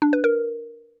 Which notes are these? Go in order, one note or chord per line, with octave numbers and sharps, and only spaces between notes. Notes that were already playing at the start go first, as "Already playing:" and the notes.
D4
B4
A#4